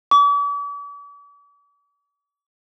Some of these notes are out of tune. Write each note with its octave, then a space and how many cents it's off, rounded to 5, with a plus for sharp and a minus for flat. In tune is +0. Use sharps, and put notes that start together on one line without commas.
D6 -45